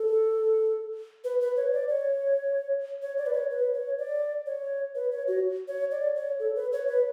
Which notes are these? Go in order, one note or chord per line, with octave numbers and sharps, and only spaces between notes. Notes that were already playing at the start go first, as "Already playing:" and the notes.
Already playing: A4
B4
B4
C#5
D5
C#5
C#5
D5
B4
C#5
B4
C#5
D5
C#5
B4
C#5
F#4
C#5
D5
C#5
A4
B4
C#5
B4